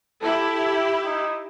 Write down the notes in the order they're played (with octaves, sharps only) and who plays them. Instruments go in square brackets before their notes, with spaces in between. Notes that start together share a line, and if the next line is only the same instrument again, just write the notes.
[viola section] E4 G4 [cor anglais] A4
[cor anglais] D#4